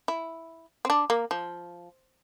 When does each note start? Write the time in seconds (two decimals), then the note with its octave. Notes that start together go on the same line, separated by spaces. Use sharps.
0.08 E4
0.85 C4
0.90 D4
1.10 A#3
1.31 F3